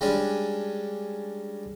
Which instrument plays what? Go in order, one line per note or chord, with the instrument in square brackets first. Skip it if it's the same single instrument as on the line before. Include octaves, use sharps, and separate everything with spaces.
[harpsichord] G3 G#3 C#4 D4